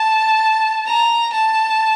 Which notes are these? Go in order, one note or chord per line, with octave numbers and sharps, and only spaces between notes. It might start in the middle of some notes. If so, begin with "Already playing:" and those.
Already playing: A5
A#5
A5